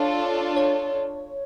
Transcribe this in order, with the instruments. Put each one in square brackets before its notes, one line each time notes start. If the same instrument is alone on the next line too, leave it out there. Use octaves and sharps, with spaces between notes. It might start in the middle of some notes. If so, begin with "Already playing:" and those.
Already playing: [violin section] D4 F4 A4 [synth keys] C#5
[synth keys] C#5